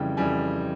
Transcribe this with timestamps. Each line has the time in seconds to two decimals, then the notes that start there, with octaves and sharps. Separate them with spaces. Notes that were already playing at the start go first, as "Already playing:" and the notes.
Already playing: F2 C#3 E3 G3 G5
0.17 F2 C#3 E3 G3 G#5